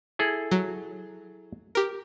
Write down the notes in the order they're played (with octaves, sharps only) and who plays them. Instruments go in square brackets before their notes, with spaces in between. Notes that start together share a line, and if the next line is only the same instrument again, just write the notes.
[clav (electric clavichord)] E4 G#4 A4
[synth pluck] F#3
G4 A#4